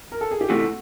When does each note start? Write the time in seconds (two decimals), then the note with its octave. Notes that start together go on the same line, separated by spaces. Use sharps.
0.12 A#4
0.21 A4
0.31 G#4
0.41 G4
0.49 C3 E3 A3 F#4